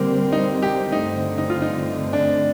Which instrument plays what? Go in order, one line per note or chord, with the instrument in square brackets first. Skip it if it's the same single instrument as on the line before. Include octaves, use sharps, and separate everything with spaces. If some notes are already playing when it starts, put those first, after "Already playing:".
Already playing: [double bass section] D3 G3 C4 [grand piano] A#3
[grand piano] D#4
G4
[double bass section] G2 D3 A3 C4 [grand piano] D#4
[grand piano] D#4
F4
D#4
D4